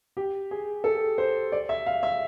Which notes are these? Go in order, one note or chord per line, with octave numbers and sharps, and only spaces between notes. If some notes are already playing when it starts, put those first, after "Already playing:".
G4
G#4
A4
C5
D5
E5
F5
E5